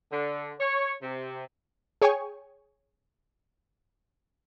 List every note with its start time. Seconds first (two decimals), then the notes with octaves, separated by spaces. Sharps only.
0.11 D3
0.60 C#5
1.01 C3
2.02 G#4 C#5 G5 G#5 C#6